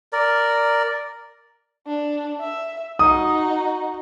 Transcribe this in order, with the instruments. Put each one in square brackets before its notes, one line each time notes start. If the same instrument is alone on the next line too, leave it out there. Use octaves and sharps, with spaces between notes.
[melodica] A#4 D5
[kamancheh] D4
E5
[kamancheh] D#4 F#4 [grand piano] D#6